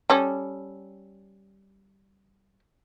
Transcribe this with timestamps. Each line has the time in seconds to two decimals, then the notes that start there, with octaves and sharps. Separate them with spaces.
0.10 G3 C#4 A4